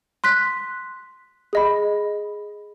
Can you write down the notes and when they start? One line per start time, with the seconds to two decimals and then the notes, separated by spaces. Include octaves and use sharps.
0.24 C6 F#6 B6
1.53 G#4 D#5 B5